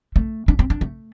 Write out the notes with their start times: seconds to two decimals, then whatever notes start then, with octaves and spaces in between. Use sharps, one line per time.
0.16 A3
0.48 D4
0.59 C4
0.70 D4
0.81 A3